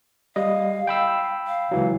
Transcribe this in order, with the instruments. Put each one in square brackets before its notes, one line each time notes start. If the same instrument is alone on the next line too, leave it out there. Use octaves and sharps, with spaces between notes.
[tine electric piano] G3 D#5 [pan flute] F5
[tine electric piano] G5 B5 E6
[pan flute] F5
[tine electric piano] C#2 E3 F#3